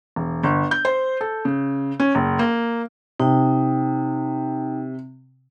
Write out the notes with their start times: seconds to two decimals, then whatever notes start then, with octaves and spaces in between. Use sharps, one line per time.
0.16 E1
0.43 G1
0.71 G6
0.85 C5
1.21 A4
1.45 C#3
2.00 C#4
2.15 F#1
2.39 A#3
3.20 C3 D#4 G5